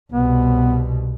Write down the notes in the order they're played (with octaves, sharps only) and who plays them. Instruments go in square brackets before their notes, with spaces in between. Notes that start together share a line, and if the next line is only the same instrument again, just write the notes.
[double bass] C2 B2 [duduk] B3